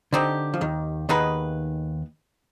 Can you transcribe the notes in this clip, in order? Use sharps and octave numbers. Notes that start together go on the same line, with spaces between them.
D3 C4 D#4 G4
F3
D#2 D#3
D#2 D#3 B3 D#4 G#4 B4